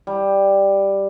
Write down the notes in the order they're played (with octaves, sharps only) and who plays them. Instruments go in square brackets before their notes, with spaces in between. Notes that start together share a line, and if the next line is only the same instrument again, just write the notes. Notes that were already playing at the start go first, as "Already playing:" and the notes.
[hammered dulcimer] G3